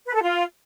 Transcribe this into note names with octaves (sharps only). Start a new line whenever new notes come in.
B4
A4
F4